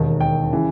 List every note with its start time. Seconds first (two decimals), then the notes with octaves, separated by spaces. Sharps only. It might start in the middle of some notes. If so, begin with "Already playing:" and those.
Already playing: E1 D#2 D#3
0.21 G5
0.52 C#3 E3